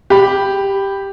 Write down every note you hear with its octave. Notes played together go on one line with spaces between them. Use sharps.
G4 B5